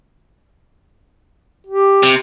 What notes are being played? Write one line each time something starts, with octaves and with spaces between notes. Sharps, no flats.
G4
C3